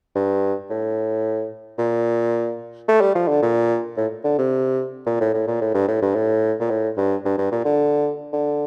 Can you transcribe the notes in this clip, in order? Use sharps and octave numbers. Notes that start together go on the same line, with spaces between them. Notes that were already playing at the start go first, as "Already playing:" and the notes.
G2
A2
A#2
A3
G3
F3
D3
A#2
A2
D3
C3
A#2
A2
A2
A#2
A2
G2
A2
G2
A2
A#2
A2
G2
G2
G2
A#2
D3
D3